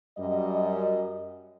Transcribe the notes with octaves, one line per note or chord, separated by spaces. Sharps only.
F#2 G3 D#5